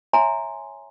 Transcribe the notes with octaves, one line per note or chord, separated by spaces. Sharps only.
C#5 E5 G#5 A#5 C6